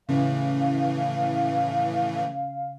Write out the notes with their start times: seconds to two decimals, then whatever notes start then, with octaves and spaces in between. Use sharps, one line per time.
0.09 A2 C#3 E3 A3 C#4 F5